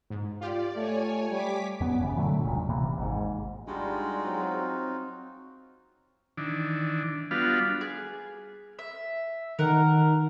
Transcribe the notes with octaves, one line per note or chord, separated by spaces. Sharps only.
G#2
F4 G4 D5
A3 C#5 G#5
G3 D6 B6
F#2 B3
F#1 C#3 E3
A#2 D3 F#3 A3
E1 C#2 A#2
D#1 C3 E3 A#3
G#1 G#2
G3 G#3 D4 D#4 F4 F#4
F#3 C4
D#3 E3 D4
G3 B3 D4 F4 F#4 F5
G#4
E5
D#3 A#4 F#5